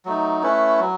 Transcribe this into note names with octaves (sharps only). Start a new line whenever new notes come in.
F#3 A3 D#4
A3 C#4 E4 B4
F#3